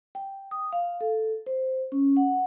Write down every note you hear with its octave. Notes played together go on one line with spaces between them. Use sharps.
G5
D#6
F5
A4
C5
C#4
F#5